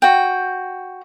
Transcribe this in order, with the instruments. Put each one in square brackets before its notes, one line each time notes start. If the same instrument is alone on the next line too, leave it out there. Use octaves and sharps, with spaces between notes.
[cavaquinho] F#4 G5